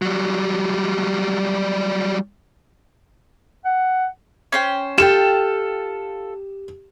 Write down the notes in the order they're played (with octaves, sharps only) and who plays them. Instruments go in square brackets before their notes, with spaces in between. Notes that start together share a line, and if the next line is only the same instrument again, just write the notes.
[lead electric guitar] F#3 G3
[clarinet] F#5
[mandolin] C#4 C5 G5
[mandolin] F4 A4 G5 [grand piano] G4 E7